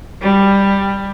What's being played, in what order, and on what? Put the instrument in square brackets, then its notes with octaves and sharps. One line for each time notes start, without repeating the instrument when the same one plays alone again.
[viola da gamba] G3